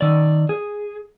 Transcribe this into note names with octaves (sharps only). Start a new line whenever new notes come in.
D#3 D5
G#4